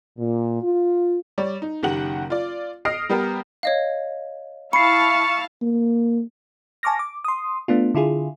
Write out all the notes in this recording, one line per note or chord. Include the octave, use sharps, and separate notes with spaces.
A#2
F4
G3 C#5 D5
D#4
F#1 D#3 G4 F#5 F#7
F4 D5
D#5 D#6 F6 A#6 C7 D7
G3 B3 G4 A#4 B4
C#5 D#5 F5
E4 F5 A5 B5 C#6 C7 C#7
A#3
G#5 A5 C#6 D6 F6 A#6
D6
C6 D#6
A3 B3 D4 F4
D3 E4 F4 G#4